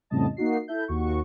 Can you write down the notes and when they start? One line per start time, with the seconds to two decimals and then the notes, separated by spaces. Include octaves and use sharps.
0.10 F2 A2 C#3 G3 D#5 A5
0.37 A#3 D#4 F#4 C7
0.68 E4 A4 E5 G6
0.88 D#2 F#4 C#6